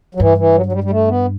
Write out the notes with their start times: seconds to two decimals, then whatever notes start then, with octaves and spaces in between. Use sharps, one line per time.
0.15 F#3
0.20 G2 E3
0.37 E3
0.55 F#3
0.66 F#3
0.72 G3
0.84 G3
0.90 A3
1.08 B3